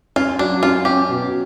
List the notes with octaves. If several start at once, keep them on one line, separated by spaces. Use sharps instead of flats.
C#4 F4
F#3 D4
C#4 F4
C#4 G4
B2